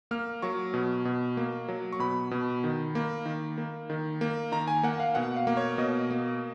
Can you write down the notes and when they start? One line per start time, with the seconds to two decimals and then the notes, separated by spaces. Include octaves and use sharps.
0.11 A#3 F6
0.42 F#3 C#6
0.74 B2
1.05 B2
1.37 A#3
1.68 F#3
1.92 C#6
1.99 B2 B5
2.31 B2
2.64 D#3
2.95 A#3
3.26 D#3
3.58 A#3
3.90 D#3
4.21 A#3
4.52 D#3 A#5
4.68 G#5
4.83 A#3 F#5
5.00 F5
5.15 B2 F#5
5.36 F5
5.47 A#3
5.57 C#5
5.78 B2 D#5
6.11 A#3